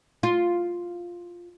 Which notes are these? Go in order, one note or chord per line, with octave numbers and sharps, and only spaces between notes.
F4